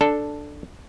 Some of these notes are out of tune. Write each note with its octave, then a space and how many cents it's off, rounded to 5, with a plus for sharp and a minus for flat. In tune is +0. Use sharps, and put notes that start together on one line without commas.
D4 +0 A4 +0